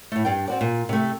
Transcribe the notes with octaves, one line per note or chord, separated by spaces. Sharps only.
A2 A3
G2 D4 G5
C4 F#4 D5
A#2
C3 A3